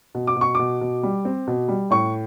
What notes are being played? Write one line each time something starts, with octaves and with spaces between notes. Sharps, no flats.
B2
D6
B2
C#6
B2 D6
B2
G3
C4
B2
G3
A2 C#6